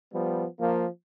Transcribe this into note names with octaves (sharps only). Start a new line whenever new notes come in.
F3 G3 B3
F3 A#3